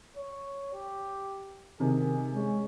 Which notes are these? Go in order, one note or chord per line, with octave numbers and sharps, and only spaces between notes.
C#5
G4
C3 D#3 G#4
G#3 C#4